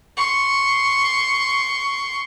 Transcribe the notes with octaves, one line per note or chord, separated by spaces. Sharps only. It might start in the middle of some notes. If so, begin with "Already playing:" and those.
C6 C#6